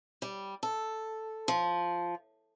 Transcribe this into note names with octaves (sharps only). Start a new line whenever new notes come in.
G3
A4
F3